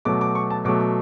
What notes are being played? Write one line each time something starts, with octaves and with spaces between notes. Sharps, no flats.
B2 F#3 A3 D6
D6
C#6
A5
B2 F#3 A3 D6
D6